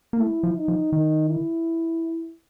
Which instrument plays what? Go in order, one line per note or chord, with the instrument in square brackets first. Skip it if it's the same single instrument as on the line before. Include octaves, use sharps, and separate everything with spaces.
[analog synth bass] A#3
[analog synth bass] A3 [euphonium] E4
[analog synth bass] F3
[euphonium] D#4
[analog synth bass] F3
[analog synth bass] D#3 [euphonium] D#4
[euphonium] E4